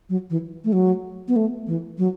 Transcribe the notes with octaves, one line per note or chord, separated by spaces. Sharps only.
F#3
E3
A3
F#3
B3
A3
E3
F#3